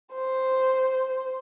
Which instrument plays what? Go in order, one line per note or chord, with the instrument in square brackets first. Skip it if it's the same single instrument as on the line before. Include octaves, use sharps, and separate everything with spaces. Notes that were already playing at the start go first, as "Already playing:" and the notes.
[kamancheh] C5